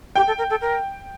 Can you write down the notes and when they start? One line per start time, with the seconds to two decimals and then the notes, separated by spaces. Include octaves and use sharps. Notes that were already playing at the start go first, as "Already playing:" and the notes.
0.16 G4 G5
0.27 A4
0.38 A#4
0.50 A4
0.61 A#4